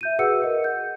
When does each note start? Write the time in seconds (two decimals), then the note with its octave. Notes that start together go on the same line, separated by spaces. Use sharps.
0.01 E5 G6 D#7
0.19 F#4 G#4 B4 F#5 E6 C#7
0.42 A#4 D#5 F#5
0.64 G6